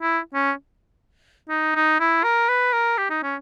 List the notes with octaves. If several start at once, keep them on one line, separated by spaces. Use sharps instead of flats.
E4
C#4
D#4
D#4
E4
A#4
B4
A#4
G4
D#4
C#4